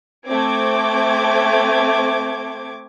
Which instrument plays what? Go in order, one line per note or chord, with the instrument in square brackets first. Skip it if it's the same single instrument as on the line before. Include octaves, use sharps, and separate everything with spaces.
[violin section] A3 C4 D6 G#6